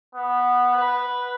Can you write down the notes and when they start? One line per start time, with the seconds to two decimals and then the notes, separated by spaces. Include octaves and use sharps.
0.15 B3
0.77 B4